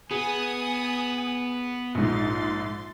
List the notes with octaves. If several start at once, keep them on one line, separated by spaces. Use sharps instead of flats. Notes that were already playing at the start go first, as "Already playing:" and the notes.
B3 G#4 G#5 D#6
A#1 G#2 C6 A6